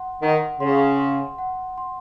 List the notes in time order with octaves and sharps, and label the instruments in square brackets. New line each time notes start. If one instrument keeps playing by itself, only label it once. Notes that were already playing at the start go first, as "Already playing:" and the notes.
Already playing: [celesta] F#5 C6
[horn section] D#3 [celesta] F#5
[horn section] C#3 [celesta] C6
[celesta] C6
F#5
C6